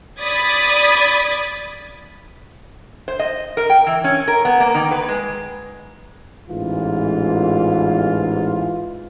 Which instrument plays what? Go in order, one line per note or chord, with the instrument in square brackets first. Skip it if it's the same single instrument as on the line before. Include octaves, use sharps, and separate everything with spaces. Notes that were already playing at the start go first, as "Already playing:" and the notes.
[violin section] D5 B5 D#6 G#6 A6 B6
[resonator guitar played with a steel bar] C5
D#5
A#4
G5
E3
C#4
A#4
B3
A#3
D#3
B4
G#3
[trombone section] A1 G#2 E3 F4